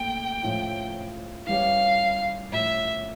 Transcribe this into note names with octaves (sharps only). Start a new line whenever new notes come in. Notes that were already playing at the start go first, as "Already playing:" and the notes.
Already playing: A#2 A3 C#4 E4 G5
A2 F3 C#4 E4
E3 G3 C#4 F5
A2 F3 C#4 E4 E5